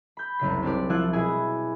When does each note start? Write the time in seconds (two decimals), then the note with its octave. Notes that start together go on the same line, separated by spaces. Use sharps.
0.17 B5 G6
0.39 F#1 C2 C#3 B6
0.63 C4 D4 G4 D5
0.89 F3 D4 E4 F4 F#6
1.13 B2 E4 G#4 G#5 B5